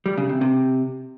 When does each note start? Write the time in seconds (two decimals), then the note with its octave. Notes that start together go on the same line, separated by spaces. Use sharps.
0.06 G3
0.17 C#3
0.29 C3
0.41 C3